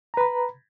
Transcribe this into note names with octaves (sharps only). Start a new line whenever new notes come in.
B4 A#5 B5